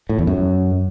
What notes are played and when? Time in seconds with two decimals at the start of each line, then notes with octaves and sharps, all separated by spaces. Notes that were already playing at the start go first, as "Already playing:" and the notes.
0.09 A2
0.18 E2
0.27 F#2